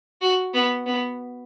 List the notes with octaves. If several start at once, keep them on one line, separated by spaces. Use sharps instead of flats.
F#4
B3
B3